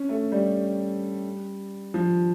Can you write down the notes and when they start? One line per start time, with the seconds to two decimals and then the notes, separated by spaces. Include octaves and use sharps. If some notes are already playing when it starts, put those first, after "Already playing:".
Already playing: C#4
0.09 A3
0.32 G3
1.94 F3